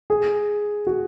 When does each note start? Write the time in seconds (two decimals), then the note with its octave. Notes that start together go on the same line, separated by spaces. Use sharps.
0.10 G#4
0.87 F#4